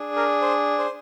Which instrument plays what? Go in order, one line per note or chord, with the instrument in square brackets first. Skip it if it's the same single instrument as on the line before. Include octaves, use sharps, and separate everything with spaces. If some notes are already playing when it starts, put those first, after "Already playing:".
Already playing: [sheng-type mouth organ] D4 G#4
A#4
C5
C5